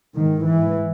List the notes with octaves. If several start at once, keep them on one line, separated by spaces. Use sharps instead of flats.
G#2 D#3
E3